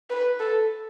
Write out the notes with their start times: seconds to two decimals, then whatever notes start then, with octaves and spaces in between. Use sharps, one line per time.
0.10 B4
0.40 A4